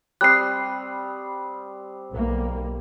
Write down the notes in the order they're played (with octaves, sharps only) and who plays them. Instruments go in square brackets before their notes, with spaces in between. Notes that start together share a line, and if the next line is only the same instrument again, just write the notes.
[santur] G3 C4 D#6 [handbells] F#6 C7
[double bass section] B1 A#3